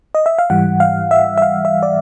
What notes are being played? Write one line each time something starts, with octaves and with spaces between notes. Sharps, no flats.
D#5
E5
F5
G#2 E3 G3 F#5
F5
E5
E5
F5
E5
D5